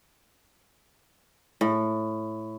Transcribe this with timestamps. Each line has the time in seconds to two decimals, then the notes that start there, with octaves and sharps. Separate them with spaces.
1.61 A2